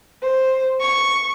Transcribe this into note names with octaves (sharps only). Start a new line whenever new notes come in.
C5
C#6